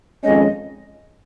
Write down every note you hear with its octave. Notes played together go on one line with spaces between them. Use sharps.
F2 D#3 G#3 C#4 D#5